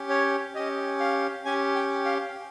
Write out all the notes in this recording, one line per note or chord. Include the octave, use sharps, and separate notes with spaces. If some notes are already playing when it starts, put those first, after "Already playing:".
Already playing: C#4 G4
C#5
C#4 G4 D#5
F5
C#4 G4 G#5
G5
F5